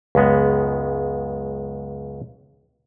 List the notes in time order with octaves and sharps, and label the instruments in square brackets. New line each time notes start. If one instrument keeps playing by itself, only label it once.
[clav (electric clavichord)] C#2 F#2 G#3 B3